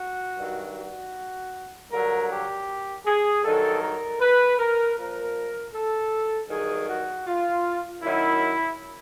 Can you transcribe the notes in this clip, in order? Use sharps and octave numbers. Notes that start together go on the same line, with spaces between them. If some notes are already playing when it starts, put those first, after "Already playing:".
Already playing: F#4
G2 D#3 F#3
F#4
G2 D3 F#3 A#4
G4
G#4
G2 D#3 F#3 A4
A#4
B4
A#4
A#2 F3 A#4
A4
G2 D#3 F#3 G#4
F#4
F4
F#2 D#3 F#3 E4